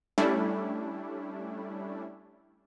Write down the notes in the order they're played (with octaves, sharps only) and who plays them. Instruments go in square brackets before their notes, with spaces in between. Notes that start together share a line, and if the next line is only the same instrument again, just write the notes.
[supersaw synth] G3 A3 C#4 D4 E4